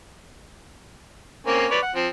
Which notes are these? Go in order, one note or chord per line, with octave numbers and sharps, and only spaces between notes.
A#3 C4 C#4
B4 C#5 D5
F#5
F3 C4